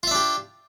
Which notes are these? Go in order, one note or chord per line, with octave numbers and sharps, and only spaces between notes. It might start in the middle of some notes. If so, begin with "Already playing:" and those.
D4 F4 G4 E5